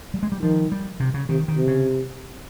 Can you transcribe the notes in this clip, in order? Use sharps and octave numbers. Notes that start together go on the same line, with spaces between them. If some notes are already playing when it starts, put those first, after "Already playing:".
G3
G#3
G3
D#3 F3
G3
C3
C#3
C3 D#3
D#3
C3
C#3